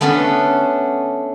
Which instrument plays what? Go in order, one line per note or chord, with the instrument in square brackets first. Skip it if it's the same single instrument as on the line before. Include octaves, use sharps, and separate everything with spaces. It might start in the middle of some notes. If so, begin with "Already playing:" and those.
[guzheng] A3 B3 C#4 D4 B5